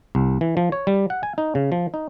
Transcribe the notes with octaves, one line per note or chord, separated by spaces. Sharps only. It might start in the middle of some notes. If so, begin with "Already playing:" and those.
C2
E3
F3
C#5
G3
F#5
G#5
D#4
C#3
F3
D#4